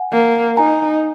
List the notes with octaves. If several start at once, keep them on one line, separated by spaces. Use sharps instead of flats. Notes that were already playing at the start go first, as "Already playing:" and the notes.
Already playing: F#5 G#5
A#3
D#4 G#5 A#5